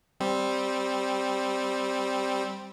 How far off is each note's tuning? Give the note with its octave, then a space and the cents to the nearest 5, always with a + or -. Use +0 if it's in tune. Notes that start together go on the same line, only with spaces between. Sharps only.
G3 +0 C4 +0